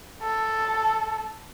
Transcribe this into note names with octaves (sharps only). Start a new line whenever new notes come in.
A4